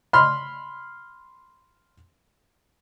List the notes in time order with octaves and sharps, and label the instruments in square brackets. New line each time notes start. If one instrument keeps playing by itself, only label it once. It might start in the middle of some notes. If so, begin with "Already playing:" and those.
[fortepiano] B5 C6 F6